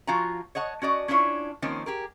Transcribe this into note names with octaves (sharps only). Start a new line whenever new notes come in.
F3 F4 F#4 G#5 A#5
C#5 D#5 F#5 A5
C#4 F#4 D5 D#5
C#4 D4 E4 F4 C#5
D#3 F3 A#3 C4 C#4
G4 G#4 A#4